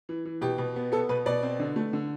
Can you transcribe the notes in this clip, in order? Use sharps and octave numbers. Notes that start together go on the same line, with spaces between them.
E3
E3
B2 G4
B2
B3
B3 A4
B2 B4
B2 D5
C4
D3
A3
D3